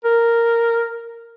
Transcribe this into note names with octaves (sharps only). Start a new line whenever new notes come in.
A#4